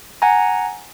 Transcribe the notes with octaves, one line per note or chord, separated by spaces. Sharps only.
F#5 G#5 A#5